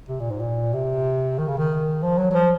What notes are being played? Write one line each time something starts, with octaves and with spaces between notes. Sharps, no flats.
C3
A#2
G#2
A#2
C3
D#3
C#3
D#3
F3
F#3
F#3
F3